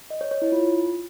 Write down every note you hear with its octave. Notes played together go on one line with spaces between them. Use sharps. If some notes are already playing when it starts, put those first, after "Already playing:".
D#5
C#5
C#5
E4
F4